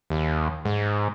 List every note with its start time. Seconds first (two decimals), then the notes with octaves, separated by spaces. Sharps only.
0.10 D#2
0.65 G#2